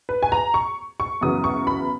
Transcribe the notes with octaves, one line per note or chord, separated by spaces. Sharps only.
B4
G#5
A#5
C#6
C#6
F#2 C#3 E3 B3 D#6
C#6
B5